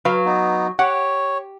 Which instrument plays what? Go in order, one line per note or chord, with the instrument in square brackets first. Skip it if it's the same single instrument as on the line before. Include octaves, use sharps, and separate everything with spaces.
[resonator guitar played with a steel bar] F#3 [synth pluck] B4 F5
[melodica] B3 D#4
[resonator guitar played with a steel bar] G4 [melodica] C#5 [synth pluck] F#5